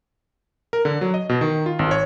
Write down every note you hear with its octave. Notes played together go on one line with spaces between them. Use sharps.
A#4
D3
F#3
D#5
B2
D#3
F4
G#1
C#5